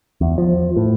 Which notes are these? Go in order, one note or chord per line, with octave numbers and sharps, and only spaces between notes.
E2
F3
A2